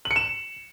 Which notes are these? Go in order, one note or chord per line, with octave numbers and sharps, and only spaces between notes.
F#7
C#7
E7